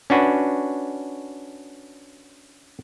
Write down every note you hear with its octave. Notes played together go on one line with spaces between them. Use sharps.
C#4 D4 F#4 B4